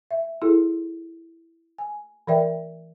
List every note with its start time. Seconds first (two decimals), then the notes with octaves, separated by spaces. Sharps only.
0.11 E5
0.42 E4 G#4 A4
1.79 G#5
2.27 E3 A#4 D5 E5 G5